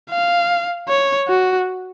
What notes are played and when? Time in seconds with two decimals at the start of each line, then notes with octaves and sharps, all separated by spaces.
0.10 F5
0.88 C#5
1.28 F#4